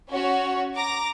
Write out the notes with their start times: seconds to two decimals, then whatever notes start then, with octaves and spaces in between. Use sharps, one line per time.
0.10 C#4 F#4 C#5
0.76 A#5 D6 A#6